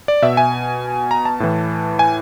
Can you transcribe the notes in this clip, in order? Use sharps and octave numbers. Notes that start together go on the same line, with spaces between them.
D5
B2 E5
G#5
A#5
A5
A2 E3
G#5